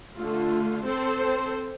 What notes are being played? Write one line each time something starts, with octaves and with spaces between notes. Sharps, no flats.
D3 A3 F4
C4 A4 C5